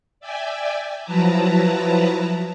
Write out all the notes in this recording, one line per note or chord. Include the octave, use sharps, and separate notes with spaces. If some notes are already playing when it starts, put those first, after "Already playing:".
D5 E5 G5 G#5
F3 F#3 E4 B4 A5 A#5